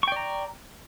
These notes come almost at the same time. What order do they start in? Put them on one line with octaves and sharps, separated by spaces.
C#6 G5 D5 A#5